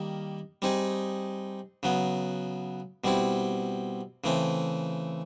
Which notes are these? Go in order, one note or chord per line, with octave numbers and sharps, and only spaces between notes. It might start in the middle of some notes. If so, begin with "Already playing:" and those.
Already playing: D#3 G3 A#3
G3 C4 D#4 G#4
C#3 F#3 B3
B2 G3 C4 E4
C#3 E3 A3 C4